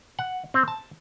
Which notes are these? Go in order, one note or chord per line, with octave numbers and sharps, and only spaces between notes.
F#5
C4
A5